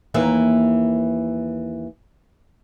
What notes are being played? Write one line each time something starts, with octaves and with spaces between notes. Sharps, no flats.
D#2 E3 A#3